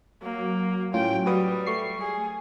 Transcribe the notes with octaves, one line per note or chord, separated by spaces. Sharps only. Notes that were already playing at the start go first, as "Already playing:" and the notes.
F#3 A#3
A2 C#4 F4 G5
G3 F#4 B4 D#6
A3 C#6 C7
G#4